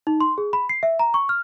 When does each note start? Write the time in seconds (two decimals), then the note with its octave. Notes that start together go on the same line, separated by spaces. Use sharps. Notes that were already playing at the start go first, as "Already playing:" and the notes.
0.07 D#4
0.21 C6
0.38 G#4
0.53 B5
0.69 C7
0.83 E5
0.99 A#5
1.14 C#6
1.29 F6